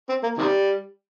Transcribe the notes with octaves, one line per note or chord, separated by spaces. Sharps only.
C4
A#3
C3 D#3 G3